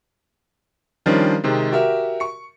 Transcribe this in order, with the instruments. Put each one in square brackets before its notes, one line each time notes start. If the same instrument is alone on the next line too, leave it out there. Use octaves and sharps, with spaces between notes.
[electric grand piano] D#3 F3 G3 C#4 D4
C3 D#3 G#3
F#4 G4 A#4 E5
C#6 C#7